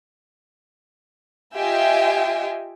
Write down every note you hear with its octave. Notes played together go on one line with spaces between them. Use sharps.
F4 G4 D#5 E5 G5 G#5